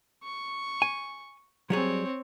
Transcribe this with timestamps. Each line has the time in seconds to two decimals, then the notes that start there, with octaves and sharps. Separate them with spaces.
0.24 C#6
0.82 G#5
1.70 F#3 G3 C4 G#4 C#5